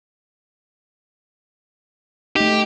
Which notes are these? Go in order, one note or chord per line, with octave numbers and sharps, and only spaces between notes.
A3 D#4 G4